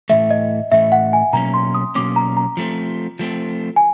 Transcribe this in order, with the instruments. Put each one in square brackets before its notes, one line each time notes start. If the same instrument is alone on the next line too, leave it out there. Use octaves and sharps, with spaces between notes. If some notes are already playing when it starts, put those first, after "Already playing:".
[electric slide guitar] A2 E3 A3 [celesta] E5
[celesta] D#5
[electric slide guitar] A2 E3 A3 [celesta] E5
[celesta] F#5
G#5
[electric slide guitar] B2 F#3 A#3 C#4 [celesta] A#5
[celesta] C6
D#6
[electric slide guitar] B2 F#3 A#3 C#4 [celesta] D6
[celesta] A#5
A#5
[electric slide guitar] F3 A3 C4
F3 A3 C4
[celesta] G#5